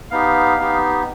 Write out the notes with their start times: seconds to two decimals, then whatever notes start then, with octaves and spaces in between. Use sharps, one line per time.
0.11 B3 D#4 G4 F5
0.58 B3 D#4 G4